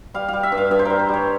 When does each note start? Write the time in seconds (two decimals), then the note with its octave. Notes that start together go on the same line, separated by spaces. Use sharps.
0.14 G3 F5
0.28 G3 F5
0.43 E5
0.52 G2
0.57 F5
0.71 G2 E5
0.79 C5
0.85 G3 A#4
0.99 C5
1.09 G3 C#5